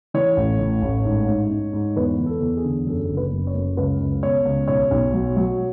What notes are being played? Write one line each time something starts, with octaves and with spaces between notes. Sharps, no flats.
E3 C#5
A1
A2
A1
G#2
G#2
G#2
G#2
E2 B4
E2
A4
E2
G#4
D3
F#2 A4
F#1
B4
F#2
C#5
F#2
C#2 B4
C#2
B2 C#5
C#2
B1 C#5
B1
F#3
F#3